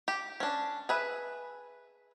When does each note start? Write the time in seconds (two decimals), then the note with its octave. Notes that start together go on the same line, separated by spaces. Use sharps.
0.08 G4
0.40 C#4 D4
0.89 G#4 B4 E5